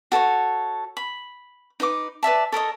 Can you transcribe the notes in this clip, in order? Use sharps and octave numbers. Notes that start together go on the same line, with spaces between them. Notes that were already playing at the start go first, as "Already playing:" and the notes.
F#4 A4 B4 C#5
B5
D#4 B4 F#5 D6
B4 D5 E5 A5
A4 A#4 C#5 D#5